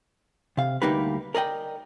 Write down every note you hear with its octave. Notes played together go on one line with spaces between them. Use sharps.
C3 F5
D2 G3 A#3 D#4 G4 B4
A#4 D5 D#5 G5